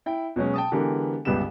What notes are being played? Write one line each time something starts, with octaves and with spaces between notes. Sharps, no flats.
E4 G5
B2 F#3 G#3 C#4
G5 A5 D#6
D3 E3 G#3 B3 G4 A#4
G1 C#2 G2 B3 G4 E7